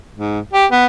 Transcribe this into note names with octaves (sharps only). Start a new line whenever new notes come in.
G#2
G4
B3